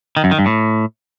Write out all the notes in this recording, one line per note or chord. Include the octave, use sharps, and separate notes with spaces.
D#3
F#2
D#3
G2
A2